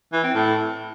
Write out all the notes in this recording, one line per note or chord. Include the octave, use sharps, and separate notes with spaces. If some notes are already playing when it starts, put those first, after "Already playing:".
E3
C4
A2